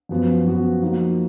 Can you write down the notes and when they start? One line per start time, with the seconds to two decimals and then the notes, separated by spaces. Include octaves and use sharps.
0.09 F#2 F3 B3 F#4
0.46 F#2 F3 B3 F#4
0.82 F3 A#3 D#4 F#4